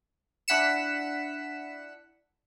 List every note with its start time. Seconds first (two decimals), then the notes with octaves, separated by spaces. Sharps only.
0.48 D4 E4 F#5 B6 C#7 E7